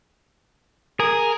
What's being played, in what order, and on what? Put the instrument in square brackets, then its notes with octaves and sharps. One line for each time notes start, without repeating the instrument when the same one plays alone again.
[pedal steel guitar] G#4 [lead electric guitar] A#4